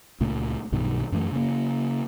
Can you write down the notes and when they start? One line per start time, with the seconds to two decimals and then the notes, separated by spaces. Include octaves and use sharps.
0.20 C#2 A#2 A3
0.72 B1 G2 B2 D#3
1.12 F#2 E3 A3
1.32 C#3 A#3